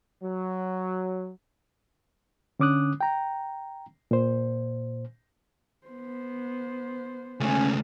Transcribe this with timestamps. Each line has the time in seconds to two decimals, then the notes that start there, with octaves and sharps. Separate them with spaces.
0.23 F#3
2.60 D3 C#4 D6 D#6 F#6
3.01 G5 A#5
4.11 A#2 C5
5.87 B3 C5
7.40 C#2 A3 C#4